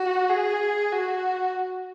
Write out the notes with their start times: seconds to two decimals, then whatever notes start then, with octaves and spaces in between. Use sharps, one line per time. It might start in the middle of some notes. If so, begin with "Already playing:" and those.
Already playing: F#4
0.29 G#4
0.92 F#4